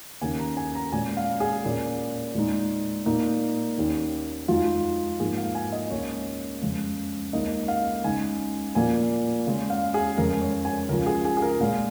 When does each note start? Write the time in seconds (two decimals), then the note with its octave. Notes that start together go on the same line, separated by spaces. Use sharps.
0.21 D#2 C#3 A#3 C#4 G#5
0.39 A#5
0.57 G#5
0.75 A#5
0.92 A#2 G#3 C#4 G#5
1.17 F5
1.40 G#4
1.64 A#2 A#3 C#4
2.35 A#2 G#3 D#4
3.06 A#2 A#3 D#4
3.78 D#2 D#3 C#4
4.48 F2 F3 G#3 D#4 F4
5.20 G#2 F3 A#3 G#4
5.37 F5
5.55 G#5
5.72 D#5
5.90 C#2 C#3 A#3 C#5
6.62 F2 C#3 G#3
7.33 C#2 C#3 A#3 D#4 D#5
7.68 F5
8.04 C#3 G#3 D#4 G#5
8.75 A#2 F3 A#3 G#5
9.47 C#3 G#3 C#4
9.70 F5
9.94 G#4
10.17 F2 C#3 G#3 A#4
10.41 C#5
10.65 G#5
10.89 C#2 C#3 F3 A#4
11.06 G#4
11.25 G#4
11.37 G#4
11.42 A#4
11.60 A#2 G#3 C#4 F5